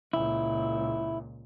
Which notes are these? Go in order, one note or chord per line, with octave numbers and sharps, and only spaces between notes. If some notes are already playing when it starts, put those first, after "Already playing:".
C#2 A#2 E4